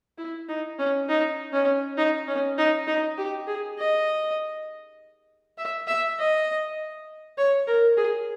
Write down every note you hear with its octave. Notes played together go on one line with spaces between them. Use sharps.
E4
D#4
C#4
D#4
C#4
D#4
C#4
D#4
D#4
G4
G#4
D#5
E5
E5
D#5
C#5
A#4
G#4